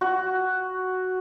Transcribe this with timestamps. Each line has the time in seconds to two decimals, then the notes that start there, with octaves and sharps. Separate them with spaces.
0.01 F#4